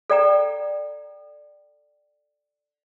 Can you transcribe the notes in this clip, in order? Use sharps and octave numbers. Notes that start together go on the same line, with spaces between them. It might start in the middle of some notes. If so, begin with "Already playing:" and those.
A4 D5 G5 A#5